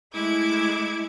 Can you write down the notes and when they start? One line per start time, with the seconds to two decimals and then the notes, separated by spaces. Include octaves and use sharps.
0.14 G#3 A3 E4 D6 G#6